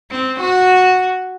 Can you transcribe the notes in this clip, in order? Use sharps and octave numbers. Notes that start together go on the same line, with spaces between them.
C4
F#4